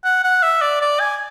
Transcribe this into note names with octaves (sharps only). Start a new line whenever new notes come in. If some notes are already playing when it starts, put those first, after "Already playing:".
F#5
F#5
E5
D5
D5
G#5